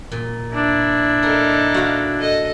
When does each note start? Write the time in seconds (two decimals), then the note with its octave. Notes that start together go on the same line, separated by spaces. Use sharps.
0.12 A#2
0.53 D4 E4
1.23 D#4 A4 A#4
1.74 F#4 F5
2.18 A4 D#5